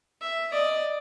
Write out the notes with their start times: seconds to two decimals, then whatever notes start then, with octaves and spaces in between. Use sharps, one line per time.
0.21 E5
0.52 D5 D#5